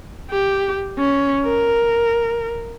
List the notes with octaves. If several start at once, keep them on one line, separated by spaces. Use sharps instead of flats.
G4
C#4
A#4